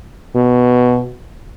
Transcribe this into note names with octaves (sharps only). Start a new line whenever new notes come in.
B2